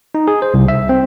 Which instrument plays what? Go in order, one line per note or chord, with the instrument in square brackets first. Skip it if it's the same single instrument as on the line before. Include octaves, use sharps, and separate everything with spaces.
[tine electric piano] D#4
G#4
C5
C2
E5
C4